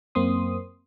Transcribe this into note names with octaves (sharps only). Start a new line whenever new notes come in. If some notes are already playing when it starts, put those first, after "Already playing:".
F#2 A#3 C4 C6 D#6